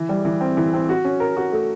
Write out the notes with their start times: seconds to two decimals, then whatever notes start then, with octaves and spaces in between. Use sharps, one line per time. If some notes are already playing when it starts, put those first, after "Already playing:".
Already playing: E3
0.09 G3
0.25 E3
0.41 C4
0.57 E3
0.74 C4
0.89 F#4
1.05 C#4
1.20 A#4
1.37 F#4
1.52 A3